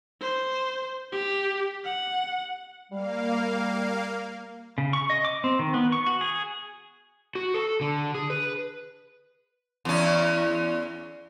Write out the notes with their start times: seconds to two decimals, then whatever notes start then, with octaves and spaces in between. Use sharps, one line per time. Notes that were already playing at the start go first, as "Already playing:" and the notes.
0.21 C5
1.12 G4
1.85 F#5
2.91 G3 A#3 F5
4.78 C#3
4.93 C#6
5.10 D#5
5.25 D6
5.44 C4
5.59 D#3
5.74 B3
5.92 C#6
6.06 F#4
6.21 G#4
7.35 F#4
7.54 A4
7.81 D3
8.15 G#4
8.30 B4
9.85 E2 C#4